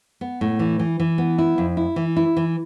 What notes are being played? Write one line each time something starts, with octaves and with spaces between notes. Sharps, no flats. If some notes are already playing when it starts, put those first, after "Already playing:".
B3
A2
E3
E3
E3
B3
E4
F2
E4
E3
E4
E3